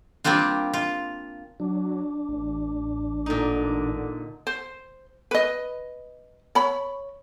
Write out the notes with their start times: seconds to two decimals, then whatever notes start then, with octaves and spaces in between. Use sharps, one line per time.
0.24 G3 A#3 C4 D4 F4
0.73 F4
1.60 F#3 D4
2.29 A1
3.26 A#2 D3 D#4
4.47 C5
5.31 B4 D#5
6.55 C#5 B5